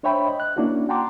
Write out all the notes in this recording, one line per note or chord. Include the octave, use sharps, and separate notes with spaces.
D4 C5 C#5 E5 G5 B5
D#5
F#6
A#3 C#4 D4 E4 F#4
F#5 G5 A5 A#5 C6 D6